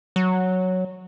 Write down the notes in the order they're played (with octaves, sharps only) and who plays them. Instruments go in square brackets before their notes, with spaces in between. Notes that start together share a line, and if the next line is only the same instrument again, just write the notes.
[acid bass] F#3